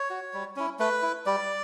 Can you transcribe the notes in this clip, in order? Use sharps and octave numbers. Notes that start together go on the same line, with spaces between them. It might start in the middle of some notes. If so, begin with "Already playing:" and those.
Already playing: C#5
F#4
G3
C#4 E4
A3 B4
E4
G3 D5